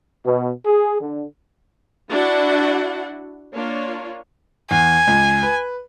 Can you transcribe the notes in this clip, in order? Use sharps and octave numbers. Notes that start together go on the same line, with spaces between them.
B2
G#4
D3
D4 E4 F#4 F#5
A#3 D4 F4 C#5
E2 G#5
C#2
B4